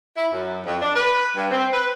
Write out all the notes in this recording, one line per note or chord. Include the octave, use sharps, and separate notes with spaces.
E4
F#2
F2
D4
B4
G2
C4
B4